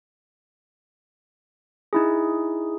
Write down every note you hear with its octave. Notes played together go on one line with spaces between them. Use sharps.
D#4 E4 G#4